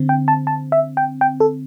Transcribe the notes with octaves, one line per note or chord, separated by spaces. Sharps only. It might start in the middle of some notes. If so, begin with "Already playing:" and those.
Already playing: D3 C4
G5
A5
A5
E5
G5
G5
A4